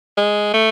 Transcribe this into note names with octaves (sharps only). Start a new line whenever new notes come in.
G#3
A3